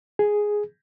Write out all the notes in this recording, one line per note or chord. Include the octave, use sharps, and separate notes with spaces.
G#4